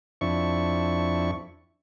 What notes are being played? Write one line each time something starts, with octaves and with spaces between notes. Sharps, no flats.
F2 D4 E4 C#6